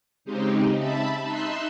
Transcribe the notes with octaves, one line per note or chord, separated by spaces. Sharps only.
C#3 G#3 C4 D#4 G4
E5 A5 B5
D#4 E5 C6 E6 F#6